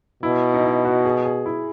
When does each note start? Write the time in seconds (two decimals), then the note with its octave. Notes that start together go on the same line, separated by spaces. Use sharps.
0.23 B2 E4
0.54 D#4
0.64 E4
0.84 F#4
1.05 G#4
1.25 G#4
1.46 E4